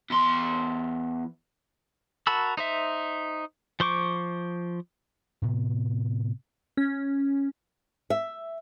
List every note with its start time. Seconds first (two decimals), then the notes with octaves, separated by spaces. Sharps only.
0.10 E2 C6
2.27 F#4 A#4 A5 B5 E6
2.57 D#4 C5 E5
3.80 F3 C5 C#6 D6
5.42 A2 C3 B3
6.77 C#4
8.10 E5